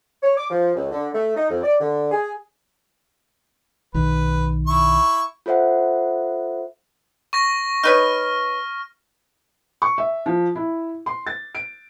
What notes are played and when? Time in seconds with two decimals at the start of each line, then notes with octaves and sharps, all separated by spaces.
0.22 C#5
0.37 D6
0.50 F3
0.75 C#2
0.91 D3
1.14 A3
1.36 D#4
1.50 F2
1.63 D5
1.80 D3
2.11 G#4
3.94 B1 D#3 B4
4.67 E4 C#6
5.46 F4 A4 C5 E5 F#5
7.33 C#6 A#6
7.84 D#4 B4 C#5 F6
9.82 C#6
9.98 E5
10.26 F3
10.55 E4
11.06 C6
11.27 A6
11.55 D7